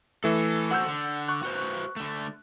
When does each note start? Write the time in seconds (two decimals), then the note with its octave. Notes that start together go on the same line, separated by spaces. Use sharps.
0.24 E3 A3 A4
0.71 F#4 A4 C5 F#5 E6 G6
0.87 D3
1.28 C#6 F#6
1.43 F#4 B4 C5
1.96 D3 A3